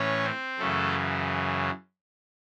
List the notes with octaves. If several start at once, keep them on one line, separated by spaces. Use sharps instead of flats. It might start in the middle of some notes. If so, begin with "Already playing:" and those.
Already playing: A2 E3 C#4 C#5
C4 C5
F#2 C#3 E3 A3 A4